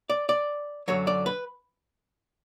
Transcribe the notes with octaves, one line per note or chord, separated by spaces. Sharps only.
D5
D5
F#2 D3 F#3 C#5
D5
B4